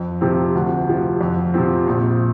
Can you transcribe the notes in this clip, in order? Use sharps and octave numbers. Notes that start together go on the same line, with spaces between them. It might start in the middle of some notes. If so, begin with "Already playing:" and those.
Already playing: F2
C3 F3 C4
D2
C3 F3
F2
C3 F3 C4
A#1